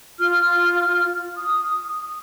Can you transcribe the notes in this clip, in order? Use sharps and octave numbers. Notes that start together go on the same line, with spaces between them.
F4 F6
D#6